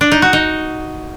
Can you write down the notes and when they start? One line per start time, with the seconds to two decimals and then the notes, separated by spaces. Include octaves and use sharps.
0.01 D4
0.12 D#4
0.22 F#4
0.33 D#4